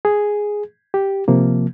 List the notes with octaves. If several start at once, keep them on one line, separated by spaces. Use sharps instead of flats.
G#4
G4
C3 F3 A#3